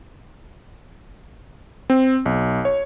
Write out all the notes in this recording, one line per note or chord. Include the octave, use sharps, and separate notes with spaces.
C4
B1
C#5